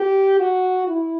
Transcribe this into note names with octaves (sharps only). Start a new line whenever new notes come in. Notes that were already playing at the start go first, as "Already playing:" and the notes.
Already playing: G4
F#4
E4